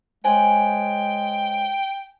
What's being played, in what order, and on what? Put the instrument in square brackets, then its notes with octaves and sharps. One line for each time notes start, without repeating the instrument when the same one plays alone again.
[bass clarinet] G#3 [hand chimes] C5 C#5 [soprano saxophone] G5 [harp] G#5